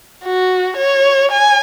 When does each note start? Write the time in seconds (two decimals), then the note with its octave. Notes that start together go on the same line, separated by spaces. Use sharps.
0.24 F#4
0.77 C#5
1.32 G#5